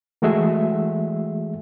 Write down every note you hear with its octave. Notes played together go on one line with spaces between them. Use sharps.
E3 G#3 A3 F#4 G#4 E5